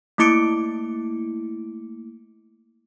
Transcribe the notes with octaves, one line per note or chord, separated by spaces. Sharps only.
A3 A#3 E4 D6 C#7 D7